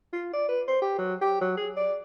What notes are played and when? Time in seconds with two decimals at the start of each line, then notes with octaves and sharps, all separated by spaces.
0.13 F4
0.33 D5
0.49 B4
0.68 C5
0.82 G4
0.98 F#3
1.21 G4
1.41 F#3
1.57 G#4
1.76 D5